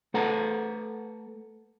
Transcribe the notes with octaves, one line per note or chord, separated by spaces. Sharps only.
A3 A4 B4 F#5 A5 A#5